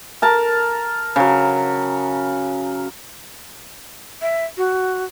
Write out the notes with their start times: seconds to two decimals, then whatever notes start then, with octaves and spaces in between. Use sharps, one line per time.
0.22 A#4 A5
1.16 C#3 F#3
4.22 E5
4.57 F#4